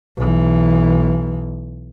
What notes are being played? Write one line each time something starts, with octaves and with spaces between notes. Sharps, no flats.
B1 E3